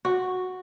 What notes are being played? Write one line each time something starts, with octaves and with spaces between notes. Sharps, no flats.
F#4